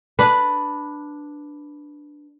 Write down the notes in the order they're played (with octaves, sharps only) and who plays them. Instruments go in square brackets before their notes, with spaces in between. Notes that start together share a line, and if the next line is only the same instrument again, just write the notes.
[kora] D4 B4